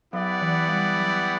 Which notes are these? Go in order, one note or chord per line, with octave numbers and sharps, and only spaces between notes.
F#3 B3 E4 G4 D5 F#5
E3
G3
F#3